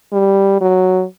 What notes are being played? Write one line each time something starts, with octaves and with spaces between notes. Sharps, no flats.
G3
F#3